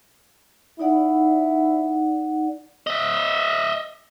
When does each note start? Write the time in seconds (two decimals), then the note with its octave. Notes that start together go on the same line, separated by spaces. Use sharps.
0.79 D#4 E4 D5 F#5
2.87 D#5 E5